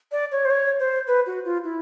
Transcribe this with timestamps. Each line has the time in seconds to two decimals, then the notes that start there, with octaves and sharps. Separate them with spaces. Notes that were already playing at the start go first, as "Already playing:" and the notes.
0.12 D5
0.32 C#5
0.45 C5
0.50 C#5
0.79 C5
1.07 B4
1.26 F#4
1.45 F4
1.64 E4